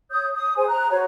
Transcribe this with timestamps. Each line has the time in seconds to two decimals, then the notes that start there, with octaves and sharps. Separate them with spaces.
0.11 C#5 D#6 G6
0.35 D#6
0.57 G#4 C5 G#5
0.68 A#5 F#6
0.91 F#4 C5 C#5